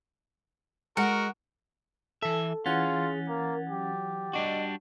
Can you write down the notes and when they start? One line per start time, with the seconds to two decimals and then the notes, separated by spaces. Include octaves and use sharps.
0.97 G#3 F#4 A#4 F#5
2.22 E3 A4 E5
2.66 E3 C#4 F4 G#4 F#5 A6
3.28 A#3 A#4
3.69 F#3 G4
4.33 G3 D4 F#4 D#5